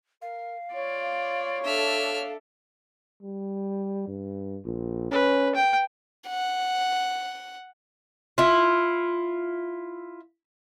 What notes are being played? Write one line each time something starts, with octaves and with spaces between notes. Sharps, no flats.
A#4 F5
F4 C#5 D5
D4 A4 E5 F6
G3
G2
A#1
C#4 B4
G5
F#5
E4 F4